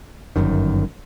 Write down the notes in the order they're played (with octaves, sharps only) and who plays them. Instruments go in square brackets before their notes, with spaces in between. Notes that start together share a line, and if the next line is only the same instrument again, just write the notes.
[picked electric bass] G1 F#2 D#3